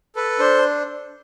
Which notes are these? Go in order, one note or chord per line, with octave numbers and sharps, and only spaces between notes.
A4 B4
D4 C5